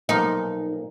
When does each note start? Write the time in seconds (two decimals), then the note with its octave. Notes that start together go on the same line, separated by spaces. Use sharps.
0.09 B1 A#2 F3 D#4